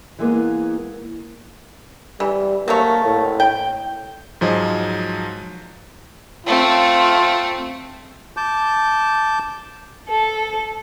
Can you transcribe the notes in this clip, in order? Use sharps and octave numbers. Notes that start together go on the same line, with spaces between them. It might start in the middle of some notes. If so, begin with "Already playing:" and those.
E3 G#3 A#3 B3
E3 G3
F#3 A3 A#3 C#5
A2
G5
G#2 F3 F#3 G#4 D#5
A3 C4 F4
A5 D6 G6
A4